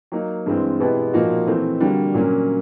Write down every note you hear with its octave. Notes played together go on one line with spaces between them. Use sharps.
F#3 A#3 D#4
G2 E3 G#3 C4
B2 G#3 B3 E4 G4
A#2 F3 A#3 D#4 F#4
E3 A3 C4
D3 G3 A#3 D4 F#4
A#2 F#3 A#3 C#4